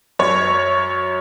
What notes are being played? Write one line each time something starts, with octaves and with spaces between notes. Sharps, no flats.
F#2 C#5